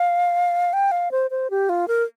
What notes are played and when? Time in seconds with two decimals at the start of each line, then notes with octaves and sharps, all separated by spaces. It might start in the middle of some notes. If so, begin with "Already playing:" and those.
Already playing: F5
0.73 G5
0.91 F5
1.11 C5
1.31 C5
1.50 G4
1.69 F4
1.88 A#4